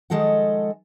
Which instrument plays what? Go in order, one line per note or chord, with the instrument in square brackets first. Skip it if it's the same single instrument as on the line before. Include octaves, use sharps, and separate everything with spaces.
[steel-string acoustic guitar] D#3 F3 G#3 A4 D#5 F#5